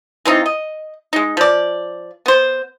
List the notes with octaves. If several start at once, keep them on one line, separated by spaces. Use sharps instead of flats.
E3 C4 D#4 F4
D#5
G#3 D#4
F3 D5
B3 C5